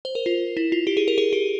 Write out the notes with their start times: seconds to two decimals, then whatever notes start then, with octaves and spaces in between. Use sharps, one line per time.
0.05 C5
0.15 A#4
0.26 F4
0.57 E4
0.72 F4
0.87 G4
0.97 G#4
1.08 A#4
1.18 G#4
1.33 G4